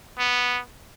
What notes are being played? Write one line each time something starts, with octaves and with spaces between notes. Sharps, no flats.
B3